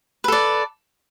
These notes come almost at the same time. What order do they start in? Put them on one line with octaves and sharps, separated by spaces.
B4 A4 D5